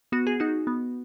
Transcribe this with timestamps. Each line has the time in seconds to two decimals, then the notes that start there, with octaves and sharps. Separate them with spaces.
0.12 B3 F#4
0.27 G#4
0.40 D#4 F#4
0.67 B3